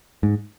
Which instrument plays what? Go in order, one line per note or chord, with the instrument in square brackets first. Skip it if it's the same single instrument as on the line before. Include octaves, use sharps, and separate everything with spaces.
[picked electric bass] G#2